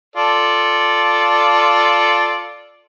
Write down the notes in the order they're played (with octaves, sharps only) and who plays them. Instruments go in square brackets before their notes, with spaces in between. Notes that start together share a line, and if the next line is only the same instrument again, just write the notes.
[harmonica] F4 A4 D5